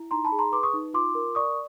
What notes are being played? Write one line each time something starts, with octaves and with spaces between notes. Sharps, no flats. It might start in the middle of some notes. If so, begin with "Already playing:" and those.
Already playing: E4
D#4 A#5 C6
A5 B5
G#4
A#5 C6
B4 C6 D6
C#6 D#6
D#4
F4 C6 D6
A#4
D5 C#6 D#6